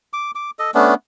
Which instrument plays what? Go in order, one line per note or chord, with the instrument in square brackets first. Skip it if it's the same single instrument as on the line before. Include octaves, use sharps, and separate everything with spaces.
[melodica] D6
D6
A4 D#5
A3 B3 C#4 D4